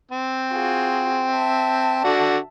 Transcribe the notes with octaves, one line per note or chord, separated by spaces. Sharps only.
C4
F4 F#4 G#4
E5 A5
D3 F#4 D5